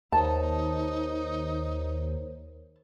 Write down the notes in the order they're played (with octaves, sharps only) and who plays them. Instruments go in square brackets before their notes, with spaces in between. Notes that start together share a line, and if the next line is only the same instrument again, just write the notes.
[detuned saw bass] D#2 [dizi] D#4 [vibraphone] A#4 C5 C#5 [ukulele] A5